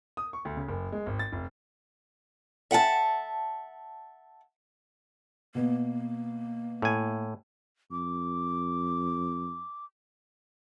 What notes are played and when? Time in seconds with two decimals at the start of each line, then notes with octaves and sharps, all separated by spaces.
0.17 D#6
0.33 C#6
0.45 D2
0.57 C#3
0.69 F#1
0.92 G#3
1.06 G#1
1.19 A6
1.33 F1
2.71 E5 F#5 G5 A5
5.55 B2 A#3 B3
6.82 A2 G#5
7.91 F2 D6